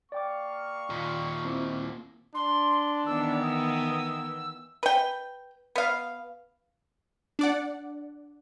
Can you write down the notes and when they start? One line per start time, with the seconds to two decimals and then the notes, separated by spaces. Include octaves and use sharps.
0.12 A#3 D5 F5 G5 C#6 D6
0.90 D#2 A#2
1.45 C4 E4 D6
2.35 D4 C6
3.07 D#3 E3 B3 E6
3.43 D#6
4.83 B4 G5
5.76 B3 F5
7.39 D4 D5 F#5